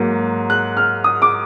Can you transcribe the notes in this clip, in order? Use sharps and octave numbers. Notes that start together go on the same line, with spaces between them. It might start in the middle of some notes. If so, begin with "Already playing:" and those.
Already playing: G#2 F#3 A#3
F#6
F6
D#6
D6